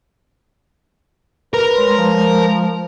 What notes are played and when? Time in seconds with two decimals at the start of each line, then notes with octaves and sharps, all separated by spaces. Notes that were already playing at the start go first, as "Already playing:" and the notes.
1.54 A#4 B4
1.75 G#3 C#5 C6
1.97 F3 G#3 A#5